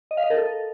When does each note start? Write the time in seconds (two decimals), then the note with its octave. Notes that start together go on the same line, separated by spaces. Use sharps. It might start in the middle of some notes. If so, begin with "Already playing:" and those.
0.11 D#5
0.17 F5
0.24 D#5
0.30 A#4
0.37 A4